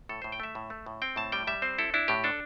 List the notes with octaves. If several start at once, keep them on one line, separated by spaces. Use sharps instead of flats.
A2 A4
A2 C5
G5
A3 E5
A2
A3
A2
C4 G5
A2 A5
G3 G5
G3 E5
C4 C5
E4 A4
D4 E4
A2 G4
D4 A4